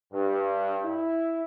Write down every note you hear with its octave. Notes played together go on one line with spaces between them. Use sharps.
G2
E4